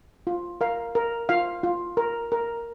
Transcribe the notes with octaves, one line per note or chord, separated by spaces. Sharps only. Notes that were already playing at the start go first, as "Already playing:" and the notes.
F4
A#4 F5
A#4
F4 F5
F4
A#4
A#4